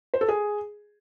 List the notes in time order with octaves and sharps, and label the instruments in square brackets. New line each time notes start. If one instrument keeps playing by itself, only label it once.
[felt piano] C5
A4
G#4